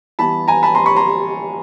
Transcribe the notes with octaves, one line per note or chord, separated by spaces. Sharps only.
E3 G3 B3 A5 B5
G#5 A#5
A5 B5
A#5 C6
B5 C#6
A#5 C6